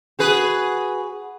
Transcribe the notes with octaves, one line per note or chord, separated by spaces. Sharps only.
F#4 G#4 B4